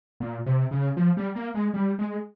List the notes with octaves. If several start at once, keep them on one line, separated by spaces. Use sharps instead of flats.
A#2
C3
C#3
F3
G3
A#3
G#3
G3
G#3